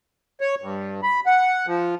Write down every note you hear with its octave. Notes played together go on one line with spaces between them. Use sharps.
C#5
G2
B5
F#5
F3